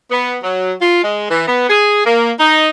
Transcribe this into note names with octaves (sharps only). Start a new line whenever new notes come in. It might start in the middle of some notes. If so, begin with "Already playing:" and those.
B3
F#3
F4
G#3
E3
B3
G#4
A#3
D#4